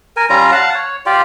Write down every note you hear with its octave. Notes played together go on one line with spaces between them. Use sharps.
A#4 G#5
G3 C#4 F4 A#5
F5 F#5 A5
C#5
F4 G4 D5